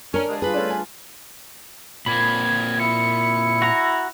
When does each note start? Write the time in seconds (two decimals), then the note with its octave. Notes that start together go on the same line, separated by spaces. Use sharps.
0.14 C#4 D4 A#4
0.29 F3 G3 G#3
0.42 G3 F4 G#4 B4
0.54 A3 C#4 D4
0.70 G#5
2.06 A#2 A#3 C4 B5 G#6
2.80 E4 C#7
3.62 F#4 A#5